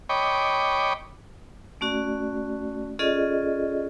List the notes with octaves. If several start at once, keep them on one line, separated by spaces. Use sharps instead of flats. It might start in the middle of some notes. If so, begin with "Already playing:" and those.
C#5 D#5 G5 B5 D6
A3 C#4 F#4 D5
C#4 F4 G#4 A4 D5 D#5